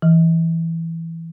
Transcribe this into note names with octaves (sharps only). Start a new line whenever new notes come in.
E3